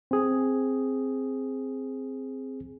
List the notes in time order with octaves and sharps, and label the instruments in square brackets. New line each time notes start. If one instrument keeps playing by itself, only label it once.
[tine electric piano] C4 G#4